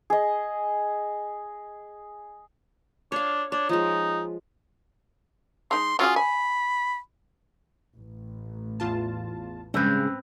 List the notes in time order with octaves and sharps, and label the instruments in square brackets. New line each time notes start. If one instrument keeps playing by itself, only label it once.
[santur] G#4 D#5
[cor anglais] D4 [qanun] C#5 F5
[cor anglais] D4 [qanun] C#5
[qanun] F3 G#3 [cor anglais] D#4
[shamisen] G#3 D#4 [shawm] C6
[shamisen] F#3 C#4 G#4 [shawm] F4
[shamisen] G#5 [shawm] B5
[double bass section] A1
[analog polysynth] E2 F4 A5
[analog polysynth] G2 [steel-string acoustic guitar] C#3 G#3 [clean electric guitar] C4 B4